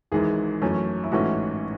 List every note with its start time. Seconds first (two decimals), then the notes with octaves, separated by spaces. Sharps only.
0.12 G#1 G#2 E3 G#4
0.62 F#2 E3 A3 C#4
1.04 E4
1.12 A1 G#2 E3 A3 C#4 F#4